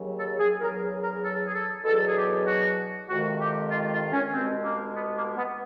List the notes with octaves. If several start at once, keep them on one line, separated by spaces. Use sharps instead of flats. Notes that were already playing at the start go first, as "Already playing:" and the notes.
Already playing: D#2 C#3 F#3
A4
G#4
E2 C#3 F#3 A#4
A#4
A4
G#4
A4
E2 B2 F#3 A4
G#4
G4
F#4
F2 C3 D#3 G#3 F#4
G4
F4
F4
C#4
C2 B2 G#3 C4
A#3
B3
A#3
B3